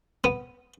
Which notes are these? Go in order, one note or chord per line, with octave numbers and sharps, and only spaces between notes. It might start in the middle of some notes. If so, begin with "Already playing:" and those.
B3